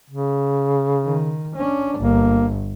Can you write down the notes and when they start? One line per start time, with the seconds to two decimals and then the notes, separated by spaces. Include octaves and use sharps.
0.10 C#3
1.05 D#3
1.56 C#4 D4
1.99 G1 A#3